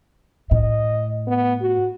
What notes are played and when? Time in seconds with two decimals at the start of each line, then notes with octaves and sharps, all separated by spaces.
0.51 A2 D#5
1.27 B3
1.61 F#4